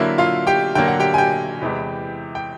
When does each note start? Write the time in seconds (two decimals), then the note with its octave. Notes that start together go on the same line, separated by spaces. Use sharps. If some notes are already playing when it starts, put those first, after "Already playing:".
Already playing: D3 F#3 A#3 E4 E5
0.18 F4 F5
0.47 G4 G5
0.75 D3 F#3 A#3 G5
0.88 F#5
1.00 G4 G5
1.14 G#5
1.18 G4 G5
1.62 E2 C3 E3 G#3
2.35 G5